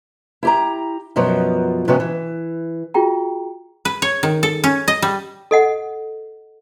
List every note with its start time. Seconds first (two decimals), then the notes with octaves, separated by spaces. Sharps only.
0.43 E4 G4 A#5
1.16 F#2 B2 F3 F#3 B3
1.88 G#2 C3 F3 B3 C#4 F#4
2.00 E3
2.94 F4 F#4 G#4 G5 A#5
3.85 B4
4.02 C#5
4.23 D#3
4.43 A4
4.64 C#4
4.88 D#5
5.02 G3
5.51 A4 D#5 F#5